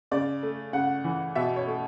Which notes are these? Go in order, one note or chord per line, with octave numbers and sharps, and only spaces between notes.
C#3 D5
A3
C#3 F#5
E3
B2 E5
C#5
A3